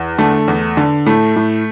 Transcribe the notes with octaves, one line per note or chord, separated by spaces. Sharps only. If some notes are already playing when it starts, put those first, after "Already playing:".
Already playing: E2
D3 A3
E2
D3
A2 A3
A2